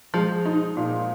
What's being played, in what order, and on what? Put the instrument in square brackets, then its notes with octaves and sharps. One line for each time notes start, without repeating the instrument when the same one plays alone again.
[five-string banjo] F3 [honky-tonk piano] G#3
[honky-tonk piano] D#4
A#2